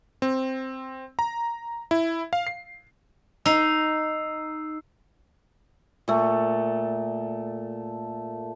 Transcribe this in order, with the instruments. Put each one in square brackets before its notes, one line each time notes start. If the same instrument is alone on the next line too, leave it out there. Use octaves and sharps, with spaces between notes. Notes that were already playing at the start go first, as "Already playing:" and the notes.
[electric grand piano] C4
A#5
E4
F5
C7
[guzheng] D#4 [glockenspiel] E6 C7
[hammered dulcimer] A#2 A3